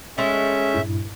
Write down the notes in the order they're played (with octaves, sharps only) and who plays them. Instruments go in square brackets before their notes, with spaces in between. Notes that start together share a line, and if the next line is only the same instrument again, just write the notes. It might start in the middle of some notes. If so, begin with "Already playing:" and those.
[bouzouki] G#3 A3 [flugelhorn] C#4 [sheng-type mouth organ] E5
[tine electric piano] G2 A#2 E4